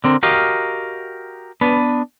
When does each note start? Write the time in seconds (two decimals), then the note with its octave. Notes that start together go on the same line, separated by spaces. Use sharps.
0.04 D3 C4 A#4
0.23 F#4 G4 A#4 D#5 F5
1.61 B3 D4 B4